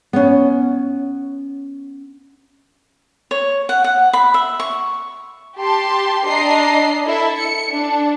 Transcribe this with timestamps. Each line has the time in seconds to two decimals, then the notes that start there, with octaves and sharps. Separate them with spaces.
0.13 B3 C#4
3.31 C#5
3.69 F#5
3.84 F#5
4.13 B5
4.34 E5
4.60 C#6
5.58 G4 A5 C6
6.25 D4 D#5 A#5 C7
7.06 E4 A4 E5
7.37 C#7
7.70 D4